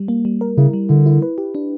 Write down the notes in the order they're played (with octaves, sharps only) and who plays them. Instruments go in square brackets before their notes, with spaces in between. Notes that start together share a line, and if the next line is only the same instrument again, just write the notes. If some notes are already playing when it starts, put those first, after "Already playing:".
Already playing: [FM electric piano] G3
A#3
G3
A#4
[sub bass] C#3 [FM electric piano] E4
[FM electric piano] G3
[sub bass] D3 [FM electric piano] E4
[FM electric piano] E4
B4
G4
D4